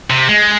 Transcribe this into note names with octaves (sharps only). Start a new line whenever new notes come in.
C3
G#3